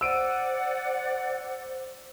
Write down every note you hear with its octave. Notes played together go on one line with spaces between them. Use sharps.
C5 D5 F#5 E6 D7 D#7